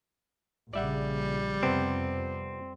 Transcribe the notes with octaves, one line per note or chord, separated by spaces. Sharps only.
A#1 C#3 G3 D5 E5 F#5
F2 C3 B3 C4